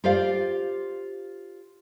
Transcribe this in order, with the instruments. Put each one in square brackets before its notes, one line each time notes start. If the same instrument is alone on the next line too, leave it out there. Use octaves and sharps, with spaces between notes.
[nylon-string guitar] F4 G4 C5 D5 F5